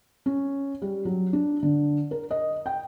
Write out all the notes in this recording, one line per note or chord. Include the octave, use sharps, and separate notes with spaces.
C#4
G3
F#3
D4
D3
A#4
D#5
G5